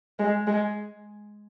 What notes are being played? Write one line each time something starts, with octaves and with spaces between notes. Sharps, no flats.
G#3
G#3